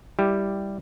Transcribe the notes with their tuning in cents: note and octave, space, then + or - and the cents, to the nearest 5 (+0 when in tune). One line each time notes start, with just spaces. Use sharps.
G3 +0 E4 +0 G4 +0